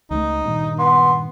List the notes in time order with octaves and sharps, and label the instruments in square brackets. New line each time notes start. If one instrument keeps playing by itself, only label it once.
[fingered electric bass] C#2 G3 A3 [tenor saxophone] D#4
[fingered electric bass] G2 A#2 D#3
[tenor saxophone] B3 [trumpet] C6